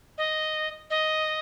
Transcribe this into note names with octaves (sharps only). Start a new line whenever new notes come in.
D#5
D#5